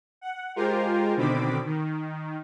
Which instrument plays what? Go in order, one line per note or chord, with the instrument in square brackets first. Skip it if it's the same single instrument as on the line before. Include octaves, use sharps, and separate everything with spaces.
[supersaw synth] F#5
G#3 F4 G4 A#4 C5
B2 D3 D#3 C4 B5 D6
D#3